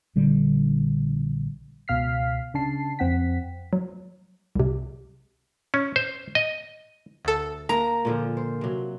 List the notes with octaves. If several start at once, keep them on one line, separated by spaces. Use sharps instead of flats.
A#1 D3 G3
C#2 B2 F5 F6 B6 C7
C#3 D4 A5 C7
F2 C4 F#5 G5 B6
F#3
C2 C3
C#4
C5
D#5
D2 A4
A#3 A#5
A#2 D3 F3
C5
C3 F#3